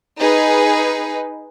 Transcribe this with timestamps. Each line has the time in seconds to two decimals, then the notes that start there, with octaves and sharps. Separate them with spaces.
0.20 D#4 G#4 B4